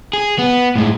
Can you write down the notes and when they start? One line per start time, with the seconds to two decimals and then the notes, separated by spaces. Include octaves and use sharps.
0.13 G#4
0.39 B3
0.76 A2 G#3